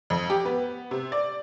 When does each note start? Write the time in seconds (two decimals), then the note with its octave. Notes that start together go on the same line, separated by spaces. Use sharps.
0.10 F2
0.30 G4
0.45 B3
0.91 C3
1.12 D5